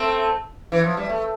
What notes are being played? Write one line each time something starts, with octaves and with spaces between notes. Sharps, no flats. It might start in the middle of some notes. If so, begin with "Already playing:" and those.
Already playing: A3 C4
E3
F3
G3
A3